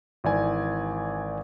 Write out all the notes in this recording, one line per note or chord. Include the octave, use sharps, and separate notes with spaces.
G#1 E3 D5 G#5